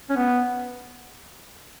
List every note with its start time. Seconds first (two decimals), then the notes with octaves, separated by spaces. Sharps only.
0.10 C#4
0.16 B3